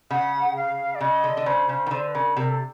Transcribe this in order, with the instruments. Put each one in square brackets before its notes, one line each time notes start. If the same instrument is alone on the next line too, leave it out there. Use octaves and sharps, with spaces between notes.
[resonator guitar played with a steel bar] C#3 [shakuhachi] F#5
[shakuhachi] F5
D5
[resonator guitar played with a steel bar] C#3 [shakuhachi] D#5
[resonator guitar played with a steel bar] D3
D3
[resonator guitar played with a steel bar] C#3 [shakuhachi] C5
[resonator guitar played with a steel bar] C#3
D#3
[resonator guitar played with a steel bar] D3 [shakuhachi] C5
[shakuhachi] B4
[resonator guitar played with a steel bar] C#3 [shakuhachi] A#4
[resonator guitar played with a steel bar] C3 [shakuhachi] A#4
[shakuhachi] A4